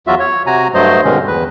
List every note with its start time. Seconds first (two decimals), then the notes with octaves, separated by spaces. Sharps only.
0.07 E2 F#3 F4 F#4 E5
0.20 C#5
0.47 C3 F#4 G#5 A#5
0.74 G2 F#3 A3 C5 D#5
1.04 G2 B2 D3 D#3 G#3 C#4
1.27 E2 B4